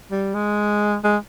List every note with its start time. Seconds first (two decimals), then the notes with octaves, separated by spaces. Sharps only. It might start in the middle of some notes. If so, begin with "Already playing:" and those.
0.11 G3
0.34 G#3
1.04 G#3